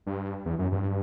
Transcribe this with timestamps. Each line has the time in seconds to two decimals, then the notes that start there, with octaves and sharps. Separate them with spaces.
0.06 G2
0.45 E2
0.59 F#2
0.72 G2